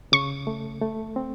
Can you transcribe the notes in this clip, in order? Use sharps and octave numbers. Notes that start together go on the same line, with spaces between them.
C#3 C#6
A3
A3
C4